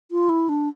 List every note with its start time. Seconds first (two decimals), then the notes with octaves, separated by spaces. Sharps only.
0.11 F4
0.29 E4
0.49 D4